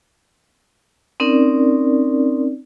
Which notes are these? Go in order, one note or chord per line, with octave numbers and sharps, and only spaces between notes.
C4 C#4 D#4 A#4 D5